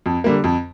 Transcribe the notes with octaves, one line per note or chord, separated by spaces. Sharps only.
F2
D3 G3 A#3
F2